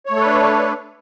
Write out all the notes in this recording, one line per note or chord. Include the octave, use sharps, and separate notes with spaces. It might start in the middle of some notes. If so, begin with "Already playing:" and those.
A3 D4 A4 B4 C#5